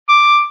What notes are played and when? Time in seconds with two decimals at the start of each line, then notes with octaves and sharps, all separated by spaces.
0.09 D6